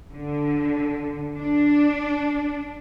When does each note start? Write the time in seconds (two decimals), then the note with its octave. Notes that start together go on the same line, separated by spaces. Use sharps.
0.12 D3
1.37 D4